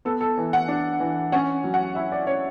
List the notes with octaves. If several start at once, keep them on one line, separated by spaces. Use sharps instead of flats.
B3 A4
A4
E3
F#5
D4
E3
C#4 F#5
F#3
F#5
E4 E5
D5
C#4 C#5